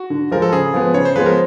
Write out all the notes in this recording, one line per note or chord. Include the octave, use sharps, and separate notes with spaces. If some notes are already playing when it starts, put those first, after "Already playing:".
Already playing: F#4
D3
F3 G#3 A#4
A4
C#3 G#4
F3 G#3 B3
C#3 C#5
C5
F3 G#3 B3 B4
A#4